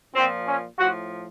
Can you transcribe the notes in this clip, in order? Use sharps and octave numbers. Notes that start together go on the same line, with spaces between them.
A#2 F3 C4
C#4
A2 F3 F#4